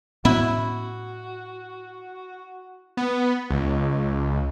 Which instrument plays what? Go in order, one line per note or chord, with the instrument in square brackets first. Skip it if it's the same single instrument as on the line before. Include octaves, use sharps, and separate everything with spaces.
[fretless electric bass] A2 B3 C#4 [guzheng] E4 [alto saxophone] F#4
[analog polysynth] B3
C#2